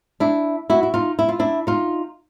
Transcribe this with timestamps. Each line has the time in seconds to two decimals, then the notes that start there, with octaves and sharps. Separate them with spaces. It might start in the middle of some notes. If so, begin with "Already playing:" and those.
0.20 D4 E4
0.70 E4 F#4
0.83 E4
0.94 D#4 F4
1.19 E4
1.29 F4
1.39 D4 E4
1.67 D#4 F4